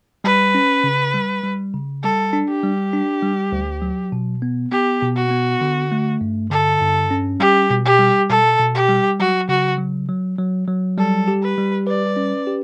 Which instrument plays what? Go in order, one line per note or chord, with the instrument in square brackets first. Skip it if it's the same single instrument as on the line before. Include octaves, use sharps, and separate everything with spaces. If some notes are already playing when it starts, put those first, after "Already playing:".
[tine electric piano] G3 [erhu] B4
[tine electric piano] C#4
C#3
G3
G3
C#3
[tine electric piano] G3 [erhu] A4
[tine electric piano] D4
[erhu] G4
[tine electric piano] G3
D4
G3
D2
F#3
B2
B3
[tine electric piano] B3 [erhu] G4
[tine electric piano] B2
[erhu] F#4
[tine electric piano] B3
D3
A3
G2
[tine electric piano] D3 [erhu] A4
[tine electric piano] G2
C#4
[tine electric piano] G3 [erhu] G4
[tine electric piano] B2
[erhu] G4
[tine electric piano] G3
[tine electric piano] B2 [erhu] A4
[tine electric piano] B2
[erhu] G4
[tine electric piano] G3
[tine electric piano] F#3 [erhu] F#4
[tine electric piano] C#3 [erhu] F#4
[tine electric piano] F#3
F#3
F#3
F#3
[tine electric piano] G3 [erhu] A4
[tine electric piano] G4
[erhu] B4
[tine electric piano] G3
[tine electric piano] B4 [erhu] D5
[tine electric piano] C#4
G4